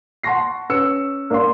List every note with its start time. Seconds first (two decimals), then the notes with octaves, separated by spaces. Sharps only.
0.23 F#5 A5 C6 C#6 A#6 C7
0.69 C#4 B4 E6 C#7
1.30 A#3 D4 A#4 F5 C6